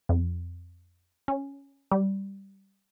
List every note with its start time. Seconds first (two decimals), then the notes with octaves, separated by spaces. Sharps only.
0.09 F2
1.28 C#4
1.92 G3